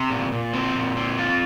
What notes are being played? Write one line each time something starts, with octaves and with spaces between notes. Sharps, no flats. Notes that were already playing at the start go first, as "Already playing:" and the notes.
Already playing: C3
A#2
A#2
C4
A#2
C4
F4